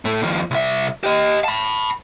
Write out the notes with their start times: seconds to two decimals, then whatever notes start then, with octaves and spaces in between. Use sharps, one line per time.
0.05 A2 A3
0.23 D#2 F3
0.51 C2 E5
1.04 G4 D#5
1.44 A5 B5